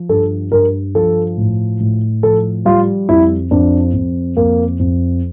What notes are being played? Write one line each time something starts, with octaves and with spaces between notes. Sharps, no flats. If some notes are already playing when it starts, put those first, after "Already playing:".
Already playing: F3
G2 A4
G2 A#4
F3 A4
A2
A2
F3 A4
G3 F4
F2 E4
F2 D4
F2
F2 A#3
F2